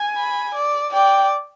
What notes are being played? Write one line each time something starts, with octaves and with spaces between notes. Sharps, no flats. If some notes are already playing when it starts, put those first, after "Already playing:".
Already playing: G#5
B5
D5
D5 G5